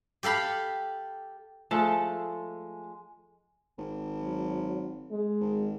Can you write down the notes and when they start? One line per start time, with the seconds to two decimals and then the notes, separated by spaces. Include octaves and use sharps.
0.23 G4 A4 F5 B5
1.71 F3 G#3 A3 A4 A5
3.78 G#1
4.20 F#3
5.11 G#3
5.40 G#1